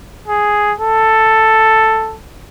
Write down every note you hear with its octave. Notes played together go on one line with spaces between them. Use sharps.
G#4
A4